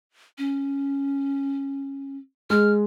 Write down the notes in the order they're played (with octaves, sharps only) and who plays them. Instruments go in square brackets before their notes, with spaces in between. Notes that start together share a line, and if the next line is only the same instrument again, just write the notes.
[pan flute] C#4
[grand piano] G#3 [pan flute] F6